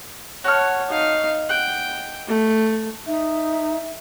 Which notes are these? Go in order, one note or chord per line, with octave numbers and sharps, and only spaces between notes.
F#4 C#5 A5 F6
D#4 F5
F#5 G5
A3
D#4 E5